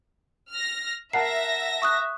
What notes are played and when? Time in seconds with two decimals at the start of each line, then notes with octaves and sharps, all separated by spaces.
0.51 F6 A#6
1.13 A#4 E5 F#5 A5 A#6 C7
1.82 C#6 D#6 F#6